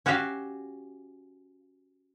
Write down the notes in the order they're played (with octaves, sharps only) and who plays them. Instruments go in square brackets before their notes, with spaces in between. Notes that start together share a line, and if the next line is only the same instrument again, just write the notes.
[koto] C#4 F#4 G4 E5 F5